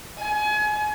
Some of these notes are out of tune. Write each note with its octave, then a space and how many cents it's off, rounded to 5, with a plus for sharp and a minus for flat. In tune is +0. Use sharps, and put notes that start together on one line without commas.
G#5 +30